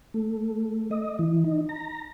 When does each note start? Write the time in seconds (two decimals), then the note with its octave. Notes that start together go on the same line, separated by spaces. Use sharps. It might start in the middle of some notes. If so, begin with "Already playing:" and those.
0.14 A3
0.91 D#5
1.19 E3
1.44 D#4
1.69 A#5